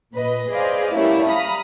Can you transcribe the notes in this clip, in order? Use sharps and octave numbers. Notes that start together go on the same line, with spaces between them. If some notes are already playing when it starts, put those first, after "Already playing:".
A#2 B4 D#5
G#4 B4 C5 D5 D#5 F5
G3 A3 A#3 C#4 E4
F5 A#5 B5 D#6